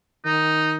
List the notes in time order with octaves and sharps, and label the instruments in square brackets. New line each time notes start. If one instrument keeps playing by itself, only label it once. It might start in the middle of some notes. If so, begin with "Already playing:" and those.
[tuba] D#3 [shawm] D#4